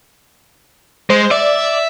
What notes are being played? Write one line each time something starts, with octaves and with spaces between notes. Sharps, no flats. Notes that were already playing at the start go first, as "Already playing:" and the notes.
G#3 C5
D5 E5